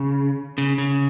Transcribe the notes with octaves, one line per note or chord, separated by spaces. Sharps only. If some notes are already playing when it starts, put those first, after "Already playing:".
Already playing: C#3
C#3
C#3